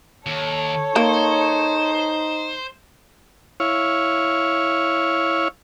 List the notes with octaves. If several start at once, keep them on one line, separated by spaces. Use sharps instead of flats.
D#2 A4 C#5
A#3 D#4 C5
E4 C#5 F5